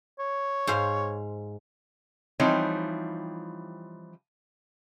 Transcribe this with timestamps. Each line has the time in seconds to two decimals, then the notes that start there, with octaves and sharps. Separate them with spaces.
0.19 C#5
0.67 G#2 C5 F5
2.40 E3 F3 G3 C4 D#4 C#5